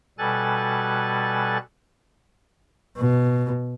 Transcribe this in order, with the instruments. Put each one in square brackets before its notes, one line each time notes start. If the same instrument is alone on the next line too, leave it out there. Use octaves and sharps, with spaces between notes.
[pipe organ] B2 G3 A4 G#5 F#6 A6
[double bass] B2